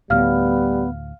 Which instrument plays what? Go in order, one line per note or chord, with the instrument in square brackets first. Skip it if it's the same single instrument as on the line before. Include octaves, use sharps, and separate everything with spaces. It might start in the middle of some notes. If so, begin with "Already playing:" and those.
[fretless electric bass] D2 A2 [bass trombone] G3 [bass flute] B3 [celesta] F5 F6